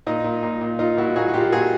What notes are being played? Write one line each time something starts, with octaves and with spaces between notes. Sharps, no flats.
A#2 D#4
A#2
A#2
A#2
A#2 D#4 F4
A#2 E4 F#4
A#2 F#4 G#4
F#4
A#2 F4 G4
A#2 F#4 G#4